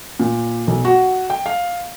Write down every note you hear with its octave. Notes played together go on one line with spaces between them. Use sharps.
A#2
B1
F#4
G5
F5